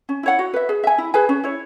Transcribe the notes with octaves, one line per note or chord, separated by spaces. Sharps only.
C#4
E4 C#5 F#5
F#4
B4 E5
G#4
E5 G#5
E4
G#4 B4 G#5
C#4
E4 C#5